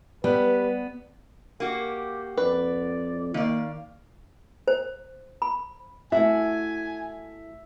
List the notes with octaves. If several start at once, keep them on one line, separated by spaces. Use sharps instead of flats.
G3 B3 B4
A#3 F#4 G4
F2 B4 D5
D#3 A#3 D5 F5
C5
B5
A3 E4 F#4 E5 G#5